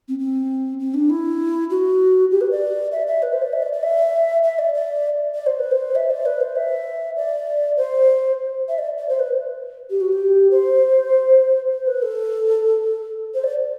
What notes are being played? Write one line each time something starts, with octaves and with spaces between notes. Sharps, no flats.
C4
C4
C4
D4
E4
F#4
G4
B4
D5
E5
E5
B4
C5
D5
E5
D5
D5
E5
E5
D5
D5
D5
C5
B4
C5
E5
D5
B4
C5
E5
D5
C5
E5
D5
D5
C5
B4
G4
F#4
G4
C5
C5
B4
A4
C5
D5